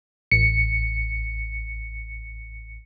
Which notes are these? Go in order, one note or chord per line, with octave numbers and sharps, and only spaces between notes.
A1 C#7